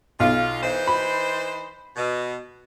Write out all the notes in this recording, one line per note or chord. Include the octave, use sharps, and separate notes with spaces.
B1 F4
E3 D#4 C5
B5
B2